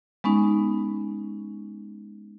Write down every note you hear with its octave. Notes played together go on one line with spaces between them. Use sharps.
G#3 B3 C#4 D#4